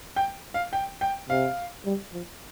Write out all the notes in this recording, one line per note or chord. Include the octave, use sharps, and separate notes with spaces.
G5
F5
G5
G5
C3 F5
G3
F3